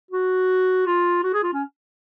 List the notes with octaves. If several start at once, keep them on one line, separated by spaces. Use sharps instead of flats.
F#4
F4
F#4
G#4
F4
C#4